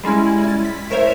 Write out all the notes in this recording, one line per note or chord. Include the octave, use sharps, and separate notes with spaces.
G3 G#3 C#4 E4
E4 A6
B6
A3 A#4 C5 C#5 E5